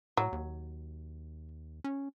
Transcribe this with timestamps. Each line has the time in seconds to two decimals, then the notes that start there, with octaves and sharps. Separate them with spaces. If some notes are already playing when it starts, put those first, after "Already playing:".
0.17 A2 F#3
0.32 D#2
1.84 C#4